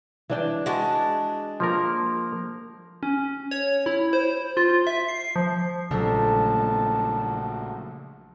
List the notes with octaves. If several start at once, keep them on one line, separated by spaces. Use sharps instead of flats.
E3 D4 G5
G#3 D4 F#4 A5
F3 A#3 A#4
C#4
C#5
E4
C5
F4
E5
C7
F3
A#1 C#3 F#3 G#3 A3 A4 A#4 A5